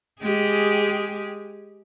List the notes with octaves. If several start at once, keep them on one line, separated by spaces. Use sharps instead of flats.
G#3 G4 G#4